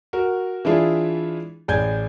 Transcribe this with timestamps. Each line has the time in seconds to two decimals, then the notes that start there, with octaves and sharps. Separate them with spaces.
0.13 F#4 A#4
0.65 E3 G#3 D4 E4 F4 G#4
1.68 A1 G#3 D5 G#5 G6 G#6